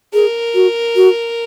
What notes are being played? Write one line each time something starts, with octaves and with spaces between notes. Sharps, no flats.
G#4 A#4
F#4
F#4